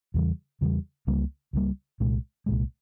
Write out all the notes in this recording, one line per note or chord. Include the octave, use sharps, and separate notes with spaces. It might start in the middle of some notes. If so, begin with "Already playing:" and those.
E2 C#3 E3 G3
E2 C#3 E3 G3
C#2 C#3 G3 A#3
C#2 C#3 G3 A#3
C2 A#2 G#3
C2 A#2 G#3